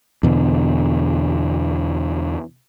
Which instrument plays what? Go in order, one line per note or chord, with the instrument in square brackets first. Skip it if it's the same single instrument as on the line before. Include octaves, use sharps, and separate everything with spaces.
[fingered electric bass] E2 B2 D3